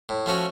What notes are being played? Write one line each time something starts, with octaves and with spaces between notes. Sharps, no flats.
A2
F3 A3 C#4 F#4